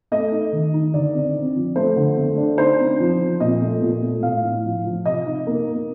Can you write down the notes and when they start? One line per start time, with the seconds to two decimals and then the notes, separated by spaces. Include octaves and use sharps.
0.12 A3 D#5
0.32 D#4
0.53 D#3
0.74 D#4
0.94 D3 D5
1.14 C4
1.34 C4
1.56 F3
1.76 A3 C5
1.96 D3
2.18 A3
2.38 D4
2.58 D#4 C5
2.80 C4
3.00 F3
3.20 C4
3.40 A#2 D#5
3.62 A3
3.82 A#2
4.03 A3
4.23 A2 F5
4.44 A2
4.64 F3
4.85 F3
5.06 C3 D#5
5.26 D#4
5.47 A#3
5.67 A#3